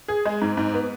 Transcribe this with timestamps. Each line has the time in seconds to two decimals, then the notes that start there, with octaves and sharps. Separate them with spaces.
0.08 G#4
0.25 G#3
0.42 G#2
0.57 G#2
0.74 B3